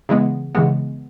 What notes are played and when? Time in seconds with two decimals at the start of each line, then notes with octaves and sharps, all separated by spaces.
0.09 C#3 E3 G#3 B3
0.55 C#3 E3 G#3 B3